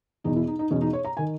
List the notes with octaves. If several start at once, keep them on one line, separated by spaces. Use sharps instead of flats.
E2 B2 D#4
E4
D#4
D#4
E2 B2 C#4
D#4
C#5
A#5
D#3 G#5